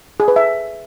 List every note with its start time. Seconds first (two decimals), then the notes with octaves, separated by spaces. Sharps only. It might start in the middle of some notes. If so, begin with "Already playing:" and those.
0.20 G#4
0.28 B4
0.36 E5